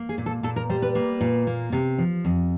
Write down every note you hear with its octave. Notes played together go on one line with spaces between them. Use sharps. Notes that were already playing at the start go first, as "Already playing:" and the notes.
Already playing: A#3
G#4
A#2
A4
A#2 A4
A#4
G3 C5
B4
A#3 B4
A#2
A#3
C3
F3
F2